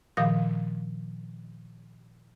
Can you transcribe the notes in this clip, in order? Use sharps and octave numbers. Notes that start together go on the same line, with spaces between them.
A#2 D#3 F3 F5 D#6 A#6